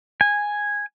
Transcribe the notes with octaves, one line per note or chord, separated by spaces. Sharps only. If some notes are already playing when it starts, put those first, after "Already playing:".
G#5